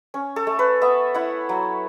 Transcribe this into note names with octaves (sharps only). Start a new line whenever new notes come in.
C#4
A4
A3
B4
B3 E5
E4 F#5
F#3